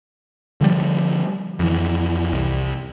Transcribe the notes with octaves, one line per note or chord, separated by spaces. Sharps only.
D3 F3 G3
F2 E3
C2